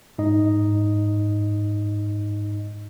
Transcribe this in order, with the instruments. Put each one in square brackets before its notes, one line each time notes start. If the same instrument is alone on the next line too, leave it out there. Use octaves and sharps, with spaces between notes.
[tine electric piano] G#2 D#4 D#5